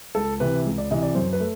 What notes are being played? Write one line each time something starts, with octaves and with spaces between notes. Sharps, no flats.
C#2 A4
C3 E3 B4
C#2
D5
C3 E3 D#5
D5
F#2 C5
B4
A3